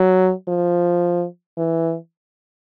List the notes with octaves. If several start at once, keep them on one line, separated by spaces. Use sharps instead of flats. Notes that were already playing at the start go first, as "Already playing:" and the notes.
Already playing: F#3
F3
E3